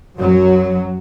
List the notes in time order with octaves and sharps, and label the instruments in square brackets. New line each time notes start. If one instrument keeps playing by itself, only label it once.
[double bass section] F#2 F#3